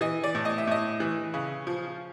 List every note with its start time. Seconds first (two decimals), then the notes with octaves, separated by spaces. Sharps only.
0.01 E3 D#5
0.24 D5
0.35 A2
0.45 D#5
0.58 E5
0.67 A2 D#5
1.00 E3
1.34 C#3
1.67 F3